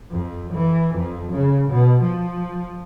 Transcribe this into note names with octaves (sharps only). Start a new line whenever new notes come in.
F2
E3
F2
C#3
B2
F3